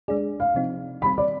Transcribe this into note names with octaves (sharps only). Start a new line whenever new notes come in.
G#3 D4 G#4 D5
F5
C3 F3 C4 D#4
D#3 G3 C4 B5
D5